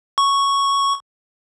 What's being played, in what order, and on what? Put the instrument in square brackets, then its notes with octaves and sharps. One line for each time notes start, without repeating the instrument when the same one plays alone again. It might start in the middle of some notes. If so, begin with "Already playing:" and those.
[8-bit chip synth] C#6